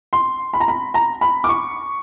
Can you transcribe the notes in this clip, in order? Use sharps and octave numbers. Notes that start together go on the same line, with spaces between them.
C6
B5
A#5
B5
A#5
B5
D6
C#6